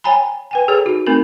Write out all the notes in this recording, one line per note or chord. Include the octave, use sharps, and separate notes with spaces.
C#5 G5 G#5 A#5 B5
B4 G5 G#5
G#4 A4 B4 C#5
D#4 F#4
A3 B3 C4 D#4 A#4